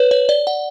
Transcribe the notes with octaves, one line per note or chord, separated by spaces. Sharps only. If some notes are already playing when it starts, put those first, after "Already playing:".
Already playing: B4 C#5
C#5
D5
F#5